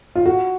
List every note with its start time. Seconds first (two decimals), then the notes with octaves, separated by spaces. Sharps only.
0.15 F4
0.26 F#4